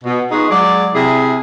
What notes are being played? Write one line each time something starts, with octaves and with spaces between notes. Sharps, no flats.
B2
B3 D#4 F4 F#4 G#4
F#3 G#3 D5
C3 E4 G#4